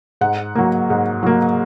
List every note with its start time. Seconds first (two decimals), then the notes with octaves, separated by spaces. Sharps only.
0.21 G#2 F#5
0.55 F#3 A#3
0.90 G#2
1.23 F#3 A#3